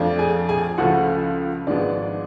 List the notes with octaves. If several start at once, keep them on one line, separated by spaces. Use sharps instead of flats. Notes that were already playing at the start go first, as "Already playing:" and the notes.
Already playing: F2 F3 A3 D4 F4
G#4 G#5
G#4 G#5
C#2 C#3 F3 A3 F#4 F#5
G#1 G#2 F3 G#3 B3 D4 D5